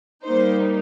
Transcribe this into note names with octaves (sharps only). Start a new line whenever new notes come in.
G3 A#3 D#4 C5